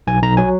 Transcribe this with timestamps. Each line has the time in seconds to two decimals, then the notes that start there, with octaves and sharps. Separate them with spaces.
0.07 B1 G#5
0.22 B1 A#5
0.37 F#3 G#5